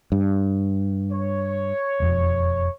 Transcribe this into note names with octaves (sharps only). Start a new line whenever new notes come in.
G2
C#5
E1 F2